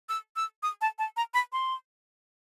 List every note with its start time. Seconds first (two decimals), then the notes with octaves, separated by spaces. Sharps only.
0.09 E6
0.36 E6
0.63 D#6
0.81 A5
0.99 A5
1.17 A#5
1.34 B5
1.53 C6